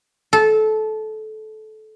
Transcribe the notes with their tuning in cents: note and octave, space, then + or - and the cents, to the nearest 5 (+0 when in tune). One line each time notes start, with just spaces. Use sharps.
A4 -20